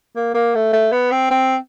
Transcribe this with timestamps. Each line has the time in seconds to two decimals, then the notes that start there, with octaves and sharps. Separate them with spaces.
0.16 A#3
0.34 A#3
0.55 A3
0.73 A3
0.92 B3
1.11 C4
1.30 C4